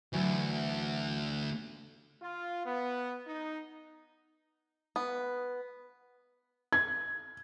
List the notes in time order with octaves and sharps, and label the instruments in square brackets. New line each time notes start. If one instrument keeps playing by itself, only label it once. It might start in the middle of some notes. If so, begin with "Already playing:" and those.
[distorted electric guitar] D2 [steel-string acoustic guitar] E3 F#3
[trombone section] F4
B3
D#4
[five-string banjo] B3
[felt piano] G#6